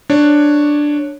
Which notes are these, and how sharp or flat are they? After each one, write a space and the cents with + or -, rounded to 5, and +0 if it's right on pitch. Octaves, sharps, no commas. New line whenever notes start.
D4 +5 C#5 +0